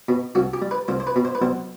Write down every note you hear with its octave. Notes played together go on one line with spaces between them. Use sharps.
B2
C2 F#4
G4
G3
B4
C2 C5
C5
B4
B2
C5
B4
B1 C5